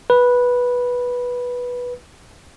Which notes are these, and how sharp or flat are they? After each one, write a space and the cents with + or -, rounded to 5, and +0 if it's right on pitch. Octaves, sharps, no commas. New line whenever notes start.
B4 -10